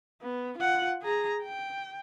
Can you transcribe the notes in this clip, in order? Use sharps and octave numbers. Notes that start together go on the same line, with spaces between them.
B3
F4 F#5
G#4 A#5
G5